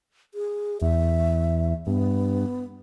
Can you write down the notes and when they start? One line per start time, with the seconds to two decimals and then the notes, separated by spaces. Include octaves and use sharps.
0.34 G#4
0.82 E2 E5
1.87 G2 B3